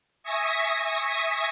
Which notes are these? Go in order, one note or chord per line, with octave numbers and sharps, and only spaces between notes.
E5 G#5 C#6 D#6 A#6 B6